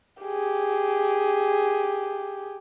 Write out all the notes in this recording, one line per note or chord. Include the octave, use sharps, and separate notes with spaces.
G4 G#4